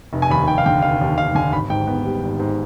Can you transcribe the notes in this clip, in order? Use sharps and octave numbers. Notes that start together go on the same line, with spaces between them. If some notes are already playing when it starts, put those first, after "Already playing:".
F1
G#5
D#2 B5
F1 G5
F5
D3 G5
F1 F5
D#2
F1 F5
D3 G#5
G#1 B5
G#2 G5
B3
G3
G#1
G#2